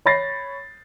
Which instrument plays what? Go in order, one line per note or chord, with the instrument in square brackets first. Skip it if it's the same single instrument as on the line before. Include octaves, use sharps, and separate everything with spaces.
[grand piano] C#5 B5 A6 A#6 C7